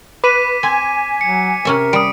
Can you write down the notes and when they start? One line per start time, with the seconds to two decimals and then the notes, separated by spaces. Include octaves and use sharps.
0.24 B4 D6 B6 D#7
0.63 C4 G#5
1.21 F#3 C#7
1.65 C3 C#4 A#4 E5
1.93 G3 D#6 D7